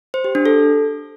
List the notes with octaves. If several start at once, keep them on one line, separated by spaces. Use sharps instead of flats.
C5
G4
D4
A4